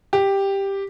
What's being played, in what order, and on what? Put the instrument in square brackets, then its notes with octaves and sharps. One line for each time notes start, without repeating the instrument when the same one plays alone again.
[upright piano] G4